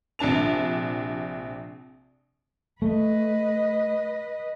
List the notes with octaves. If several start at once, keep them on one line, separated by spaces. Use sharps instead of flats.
A#1 C3 D4 A5 F7
A3 B4 D#5